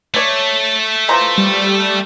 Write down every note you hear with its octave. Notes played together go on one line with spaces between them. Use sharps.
A3 C#5 D5
E3 F3 A#5
G3